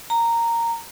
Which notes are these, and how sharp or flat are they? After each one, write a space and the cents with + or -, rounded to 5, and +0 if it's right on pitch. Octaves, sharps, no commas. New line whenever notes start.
A#5 -10